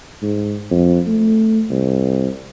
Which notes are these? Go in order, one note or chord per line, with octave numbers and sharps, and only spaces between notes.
G#2
F2
A3
C2